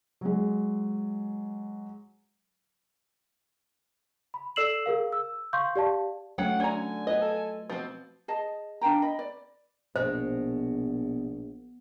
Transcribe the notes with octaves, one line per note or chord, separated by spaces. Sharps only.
F#3 G#3
B5
A4 D5 E6 C7 E7 F#7
G#4 A#4 F5
E6
F5 C6 C#6 G6
G4 D5 F5 A5
F#3 A3 C#4 F#5 G5
D3 C#4 D5 G#5 A#5
B3 F4 B4 D#5
A4
B2 F3 C4
G#4 D#5 A5
D4 F5 G5 A#5
D#5 B5
D5
A#1 B2 C5